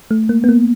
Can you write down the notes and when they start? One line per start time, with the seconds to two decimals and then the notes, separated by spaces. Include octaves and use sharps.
0.11 A3
0.29 A#3
0.44 B3
0.49 A#3